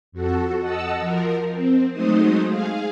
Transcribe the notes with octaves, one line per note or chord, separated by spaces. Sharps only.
F2 F#4 A4
D#5 F#5 A5 E6
F3 A#4
C4
F#3 G#3 A3 D#4 C5 D#6
G#4 F5